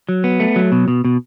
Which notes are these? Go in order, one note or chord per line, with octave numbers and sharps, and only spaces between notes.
F#3
B3
A3
F#3
B2
B2
B2